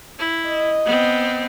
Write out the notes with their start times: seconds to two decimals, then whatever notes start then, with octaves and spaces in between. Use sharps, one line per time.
0.19 E4
0.48 D#5
0.85 B3 C4